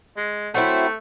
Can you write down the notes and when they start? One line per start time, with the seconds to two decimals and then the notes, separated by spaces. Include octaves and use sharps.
0.17 G#3
0.54 F#3 A3 C4 E4